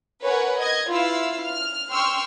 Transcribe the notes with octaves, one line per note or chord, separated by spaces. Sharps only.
A#4 B4 C#5 F#5 G#5
D#5 G#6
E4 F4 B4 F5 E6
F6
G5 C6 C#6 E6 F6